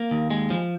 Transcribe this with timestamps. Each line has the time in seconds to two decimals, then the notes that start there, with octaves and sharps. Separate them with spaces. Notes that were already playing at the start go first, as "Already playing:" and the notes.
Already playing: A#3
0.11 D#2
0.30 G#3
0.50 F3